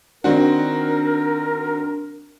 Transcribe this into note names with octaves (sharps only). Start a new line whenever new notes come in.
D#3 C4 D4 F#4 A#4